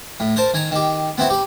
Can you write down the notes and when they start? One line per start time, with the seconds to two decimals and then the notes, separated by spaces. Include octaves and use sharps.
0.20 A2
0.36 A#4 C5 A5
0.54 D#3 G#5 A#5
0.72 D#3 G4
1.18 B3 C4 E4 F#4
1.30 G4 B5